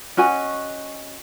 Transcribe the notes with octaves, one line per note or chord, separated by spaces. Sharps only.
C#4 F#4 D#5 G#5